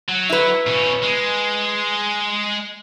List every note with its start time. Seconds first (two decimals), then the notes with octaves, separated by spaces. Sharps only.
0.09 F#3
0.30 E4 B4
0.67 B2 C#4
1.03 G#3